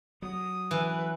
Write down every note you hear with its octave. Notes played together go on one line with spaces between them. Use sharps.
F#3 D#6
E3 B4